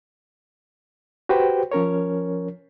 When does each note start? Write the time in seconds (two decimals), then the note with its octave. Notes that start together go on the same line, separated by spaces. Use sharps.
1.29 F#4 G4 B4 C5 G5
1.72 F3 C#4 A#4 C#5